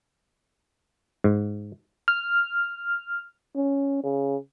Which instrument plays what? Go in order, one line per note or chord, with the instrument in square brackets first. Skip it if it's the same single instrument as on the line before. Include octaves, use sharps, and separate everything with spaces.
[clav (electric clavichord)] G#2
[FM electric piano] F6
[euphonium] C#4
C#3